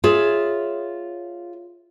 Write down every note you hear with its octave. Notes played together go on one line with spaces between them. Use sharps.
F4 G#4 C#5 E5